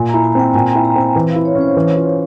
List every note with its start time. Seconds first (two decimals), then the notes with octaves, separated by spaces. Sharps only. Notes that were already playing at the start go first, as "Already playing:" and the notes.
Already playing: A#2 G#5
0.09 A#5
0.14 E4
0.24 G#5
0.35 C4 G5
0.54 A#2 G#5
0.70 A#5
0.75 E4
0.85 A#5
0.96 C4 G#5
1.16 E3
1.30 F5
1.36 E4
1.45 C#5
1.55 C#4
1.61 C5
1.77 E3
1.96 F4